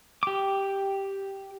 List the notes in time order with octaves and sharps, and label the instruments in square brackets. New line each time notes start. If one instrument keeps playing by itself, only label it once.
[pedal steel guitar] G4 D6